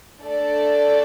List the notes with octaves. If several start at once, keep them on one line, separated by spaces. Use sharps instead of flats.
A3 D4 A4 D5